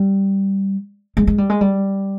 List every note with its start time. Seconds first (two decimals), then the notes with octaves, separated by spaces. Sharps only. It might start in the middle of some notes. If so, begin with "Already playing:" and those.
Already playing: G3
1.17 G#3
1.27 G#3
1.38 G3
1.50 G#3
1.61 G3